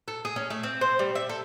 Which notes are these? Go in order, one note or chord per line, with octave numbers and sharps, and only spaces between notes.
A4
G#4
C#4
A3
C4
C5
G3
E5
A4